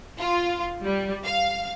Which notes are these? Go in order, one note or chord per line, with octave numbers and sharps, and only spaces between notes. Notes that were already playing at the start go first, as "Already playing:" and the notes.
F4
G3
F5